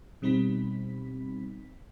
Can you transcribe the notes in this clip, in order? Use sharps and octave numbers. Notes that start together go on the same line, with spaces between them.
B2 G3 C4 D#4 B5 B6